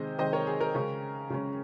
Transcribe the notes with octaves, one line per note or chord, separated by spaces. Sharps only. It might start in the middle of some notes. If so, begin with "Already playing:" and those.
Already playing: C3 D#3 G#3 C5 D#5
C3 D#3 G#3 C5 D#5
A#4 C#5
G#4
A#4
C#3 G#3 C#4
C#3 G#3 C#4